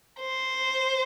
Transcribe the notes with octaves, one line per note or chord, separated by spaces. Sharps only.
C5